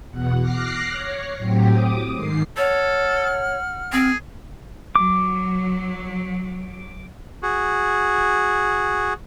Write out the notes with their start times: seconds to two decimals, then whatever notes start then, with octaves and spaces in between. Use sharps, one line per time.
0.11 E2 B2 F#5
0.40 D6 F6 F#6 A#6 C7
0.91 C#5
1.37 A2 F#3 C4 G4
1.71 D6 D#6
2.13 G#2 D#3 C7
2.57 A4 C#5 F#5 F6
3.93 C4 G#4
4.96 F#3 D6
7.43 F#4 G#4